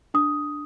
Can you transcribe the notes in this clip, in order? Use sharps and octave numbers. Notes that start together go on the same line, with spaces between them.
D4 D#6